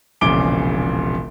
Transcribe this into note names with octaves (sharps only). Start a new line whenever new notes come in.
E1 A#1 C#3 D6 D7 G7